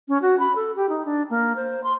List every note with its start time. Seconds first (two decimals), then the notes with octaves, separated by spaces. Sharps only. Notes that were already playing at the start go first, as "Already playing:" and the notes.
0.08 C#4
0.22 F#4
0.39 B5
0.56 A4
0.76 G4
0.89 D#4
1.05 D4
1.30 A#3
1.56 C5
1.83 C6